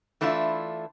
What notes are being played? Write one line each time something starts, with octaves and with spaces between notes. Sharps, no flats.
E3 A3 D4 E4 F4